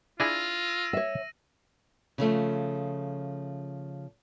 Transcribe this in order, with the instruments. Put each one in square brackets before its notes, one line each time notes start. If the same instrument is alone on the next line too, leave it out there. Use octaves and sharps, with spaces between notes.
[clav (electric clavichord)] D4 E4 G#4 [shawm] F4 [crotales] E6 A#6 D#7
[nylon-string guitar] C#5 E5
C#3 F3 A3